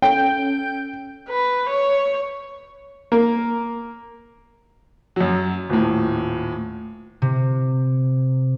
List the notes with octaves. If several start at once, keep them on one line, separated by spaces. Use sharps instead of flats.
C#4 A4 G5 G6
B4
C#5
A#3
F#2 F#3
D#1 A2
C3